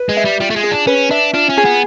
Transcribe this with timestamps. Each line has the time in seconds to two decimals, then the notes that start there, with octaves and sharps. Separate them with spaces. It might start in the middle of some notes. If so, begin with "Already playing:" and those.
Already playing: B4
0.09 G#3
0.17 E5
0.25 G3
0.40 G3 F4
0.50 A3
0.56 G#3
0.63 G#4
0.71 D4
0.87 C#4 B4
1.11 D4 E5
1.34 D4 F4
1.49 C#4
1.57 G#4
1.65 B3